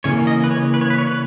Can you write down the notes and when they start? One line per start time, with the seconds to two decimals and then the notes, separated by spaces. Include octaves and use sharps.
0.04 C#3 E3 A#3 C#4 C#5
0.27 D#5
0.44 B4
0.51 C#5
0.74 B4
0.81 C#5
0.90 B4
0.98 C#5
1.07 B4